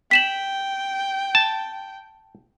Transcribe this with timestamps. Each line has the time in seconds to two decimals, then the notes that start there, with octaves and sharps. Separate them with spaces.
0.11 G5 B6 E7 F#7
1.35 A5